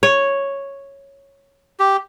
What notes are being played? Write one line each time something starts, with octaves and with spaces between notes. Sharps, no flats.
C#5
G4